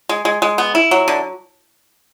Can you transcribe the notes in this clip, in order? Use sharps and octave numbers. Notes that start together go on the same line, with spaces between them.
G#3
G#3
G#3
B3
E4
F#3
D3